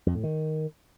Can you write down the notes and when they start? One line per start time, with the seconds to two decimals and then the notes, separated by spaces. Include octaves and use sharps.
0.06 F2
0.15 A2
0.24 D#3